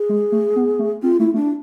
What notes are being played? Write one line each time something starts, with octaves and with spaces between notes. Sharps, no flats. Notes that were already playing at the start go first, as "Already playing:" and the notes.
Already playing: G#4
G#3
A3
B3
A3
C4 F4
A3 E4
A3 D4